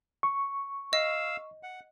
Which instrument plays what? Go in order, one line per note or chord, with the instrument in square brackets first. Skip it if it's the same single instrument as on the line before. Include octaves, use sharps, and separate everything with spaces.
[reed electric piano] C#6
[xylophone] D#5 [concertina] F5 E6
[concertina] F#5